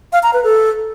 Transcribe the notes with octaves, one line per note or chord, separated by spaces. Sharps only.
F5
A#5
B4
A4